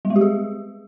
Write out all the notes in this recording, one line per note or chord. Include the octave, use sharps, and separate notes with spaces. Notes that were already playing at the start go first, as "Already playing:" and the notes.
G3
G#3
G4
G#4